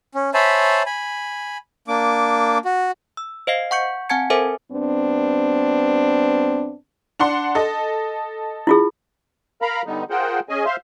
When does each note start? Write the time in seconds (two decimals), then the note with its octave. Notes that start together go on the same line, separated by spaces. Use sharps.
0.15 C#4
0.34 C5 C#5 E5 G#5 A5 B5
0.86 G#5 B5
1.88 A#3 D4 D6
2.65 F#4
3.17 E6
3.47 C5 D#5 F5 C7
3.71 F#5 C#6 G6 C#7
4.09 C4 F#5 G#5 A5 G#6 C#7
4.30 A4 A#4 C5 E5 G#5 D6
4.70 G2 B3 C4 D4
7.19 D4 F#5 C6
7.55 A4 D#5
8.67 E4 F4 G#4
9.62 A#4 F5 A#5 B5
9.86 D3 G3 B3 D#4
10.10 F4 G#4 A#4 C5 F#5 G5
10.49 C#4 G#4 D#5 G#5
10.65 C5 E5 F5 C6